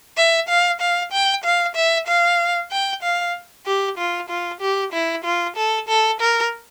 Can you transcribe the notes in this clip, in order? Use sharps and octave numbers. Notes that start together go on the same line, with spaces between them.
E5
F5
F5
G5
F5
E5
F5
G5
F5
G4
F4
F4
G4
E4
F4
A4
A4
A#4